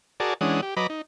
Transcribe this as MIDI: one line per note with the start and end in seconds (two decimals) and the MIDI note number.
0.20 0.34 66
0.20 0.34 68
0.20 0.34 70
0.20 0.34 74
0.20 0.34 81
0.41 0.61 52
0.41 0.61 56
0.41 0.61 61
0.41 0.61 62
0.41 0.61 78
0.41 0.61 87
0.62 0.74 67
0.77 0.87 54
0.77 0.87 71
0.77 0.87 75
0.77 0.87 82
0.77 0.87 83
0.77 0.87 86
0.90 1.02 63